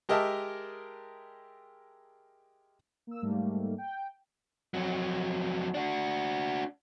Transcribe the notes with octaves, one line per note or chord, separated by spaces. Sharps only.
G#3 G4 A#4 D#5 E5 A5
A#3 E6
G#2 G3 A3 A#3
G5
F2 F#3
D4 F#4